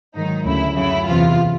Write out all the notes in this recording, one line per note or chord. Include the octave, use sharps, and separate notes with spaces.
G#2 D#3 F#3 D#4
D2 C#3 F#3 E4
F#2 C#3 F#3 E4
E2 C3 E3 F4